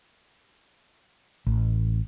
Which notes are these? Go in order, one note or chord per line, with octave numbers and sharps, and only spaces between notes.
A1